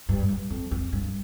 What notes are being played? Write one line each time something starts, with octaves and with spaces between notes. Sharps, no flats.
G2
G2
F2
F2
G2